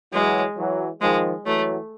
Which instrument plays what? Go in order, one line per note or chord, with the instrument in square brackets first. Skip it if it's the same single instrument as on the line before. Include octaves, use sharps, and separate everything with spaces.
[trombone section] E3 F#3 [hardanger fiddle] G#3
[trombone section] E3 F#3
[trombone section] D#3 F3 [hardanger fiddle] G#3
[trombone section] E3 F#3 [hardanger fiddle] A3